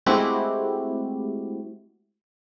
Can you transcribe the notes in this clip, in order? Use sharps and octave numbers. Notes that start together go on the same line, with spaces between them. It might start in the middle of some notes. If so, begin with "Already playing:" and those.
G#3 A3 C4 E4 F#4 G4